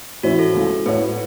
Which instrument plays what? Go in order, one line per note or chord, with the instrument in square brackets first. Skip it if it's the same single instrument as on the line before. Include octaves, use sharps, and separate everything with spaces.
[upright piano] A2 E3 C#4 E4 [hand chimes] F#4
[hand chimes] A4
[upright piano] C#2 C#3 A3
[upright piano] A2 A3 F#4 C#5 [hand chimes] B4